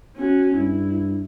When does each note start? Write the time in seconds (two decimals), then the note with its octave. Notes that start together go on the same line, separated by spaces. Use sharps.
0.17 C#4 F#4
0.56 G2 E4